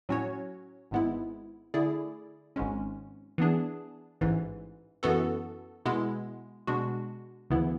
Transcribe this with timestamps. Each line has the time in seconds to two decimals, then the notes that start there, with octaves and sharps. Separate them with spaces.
0.09 A2 F#3 C#4 F#4 C#5
0.91 G#1 G#2 G#3 B3 E4
1.74 D3 A3 E4 G#4 D5
2.56 G#1 G#2 G#3 C#4
3.38 E3 B3 D4 G#4
4.21 A1 G#2 E3
5.03 F#2 E3 B3 F#4 A4
5.85 B2 G#3 B3 E4
6.67 B2 G#3 D4 F#4
7.50 D2 C#3 E3 B3 E4